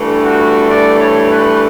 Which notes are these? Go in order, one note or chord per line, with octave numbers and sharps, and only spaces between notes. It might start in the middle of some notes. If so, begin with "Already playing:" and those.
Already playing: G2 E3 A3
F#4
D5
C#5
B4